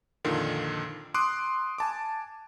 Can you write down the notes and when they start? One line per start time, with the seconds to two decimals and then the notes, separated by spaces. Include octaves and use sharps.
0.24 F2 A#2 D3 D#3
1.14 C6 D6 D#6 F#6 D7
1.78 G#5 A5 D6